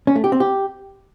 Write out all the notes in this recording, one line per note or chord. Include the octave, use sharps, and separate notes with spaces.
C#4
A3
G4
C4
G4